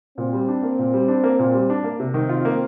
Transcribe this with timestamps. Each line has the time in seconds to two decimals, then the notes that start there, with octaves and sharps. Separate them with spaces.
0.18 A#2 C4
0.33 G3
0.48 D4
0.63 A#3
0.79 A#2
0.94 G3
1.08 D4
1.24 A#3
1.39 A#2
1.54 G3
1.70 D4
1.84 A#3
1.99 C3 C4
2.14 D#3
2.29 F4
2.45 A#3